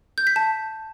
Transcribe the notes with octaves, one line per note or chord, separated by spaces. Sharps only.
G6
B6
A5